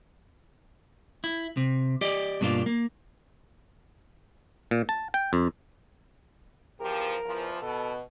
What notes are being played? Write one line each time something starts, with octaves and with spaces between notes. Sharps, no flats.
E4
C3
G4 D5 D#5
G2 B2 A#3 D4 F4
A#3
A#2
A5
G5
F2
E2 F3 G4 A#4
E2 E3 F3
B2 A4